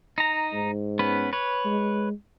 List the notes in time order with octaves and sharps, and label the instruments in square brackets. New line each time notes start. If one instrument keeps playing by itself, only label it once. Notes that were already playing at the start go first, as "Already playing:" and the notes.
[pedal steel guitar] D#4 A#5
[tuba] G#2
[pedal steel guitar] B3 C#4 B4
B4 C#5
[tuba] G#3